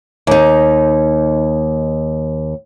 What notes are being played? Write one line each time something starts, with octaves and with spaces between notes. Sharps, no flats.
D#2 D#4